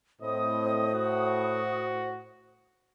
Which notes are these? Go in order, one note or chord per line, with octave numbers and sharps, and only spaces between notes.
A2 C4 C5 D#5 D#6
F#4